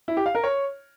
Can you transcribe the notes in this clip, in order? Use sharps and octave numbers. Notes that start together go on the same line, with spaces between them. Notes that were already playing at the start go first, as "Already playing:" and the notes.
E4
G4
F5
A#4
C#5